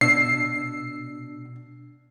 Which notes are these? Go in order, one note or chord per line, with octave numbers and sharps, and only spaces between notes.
B2 D4 E6 C7